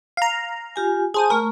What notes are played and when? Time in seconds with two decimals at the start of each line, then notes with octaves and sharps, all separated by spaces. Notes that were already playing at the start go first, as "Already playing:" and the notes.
0.17 F5 A#5
0.76 F4 G4 G#5
1.14 G#4 C5 G#5 A5 D#7
1.30 A3 A#4 A#5 C#6